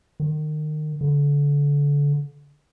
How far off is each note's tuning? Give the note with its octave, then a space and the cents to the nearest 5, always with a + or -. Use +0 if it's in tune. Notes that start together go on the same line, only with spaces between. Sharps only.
D#3 -30
D3 -30